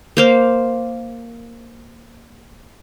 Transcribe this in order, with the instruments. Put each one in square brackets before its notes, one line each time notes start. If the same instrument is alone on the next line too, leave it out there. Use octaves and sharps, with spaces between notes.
[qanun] A#3 C5 F5